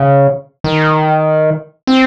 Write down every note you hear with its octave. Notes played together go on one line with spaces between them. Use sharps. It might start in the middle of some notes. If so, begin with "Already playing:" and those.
Already playing: C#3
D#3
C4